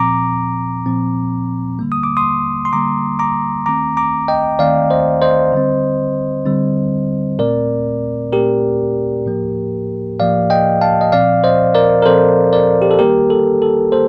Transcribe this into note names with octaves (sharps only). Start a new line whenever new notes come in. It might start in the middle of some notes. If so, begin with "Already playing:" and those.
Already playing: A#2 F3 C4 A#5 D6
A#2 F3 C4
D3 G3 A#3
D#6
D6
C6 D#6
C6
D3 G3 A#3 A#5 D6
A#5 D6
D#3 A3 C4 A#5 D6
A#5 D6
D#5 G5
D#3 A3 C4 D5 F5
C5 D#5
C5 D#5
D3 G3 C4
D3 G3 C4
A#2 A3 C4 A#4 D5
A#2 A3 C4 G4 A#4
A2 F3 A#3
A2 F3 A#3 D5 F5
D#5 G5
F5 A5
D#5
A#2 F3 C4 D5 F5
C5 D#5
A#4 D5
A#4
A#2 F3 C4 A4 C5
A#4 D5
G4
A4
D#3 G3 A#3 G4 A#4
A4
A4
A#3 A4 C5